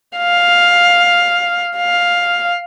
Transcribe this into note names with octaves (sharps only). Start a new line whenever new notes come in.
F5
F5